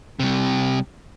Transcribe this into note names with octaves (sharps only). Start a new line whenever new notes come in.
C3 G3